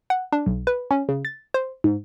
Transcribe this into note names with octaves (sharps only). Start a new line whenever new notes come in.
F#5
D4
B1
B4
C#4
C#3
A6
C5
G#2